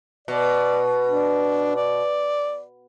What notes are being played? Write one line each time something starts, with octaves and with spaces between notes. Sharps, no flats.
B2 D5
D4
D5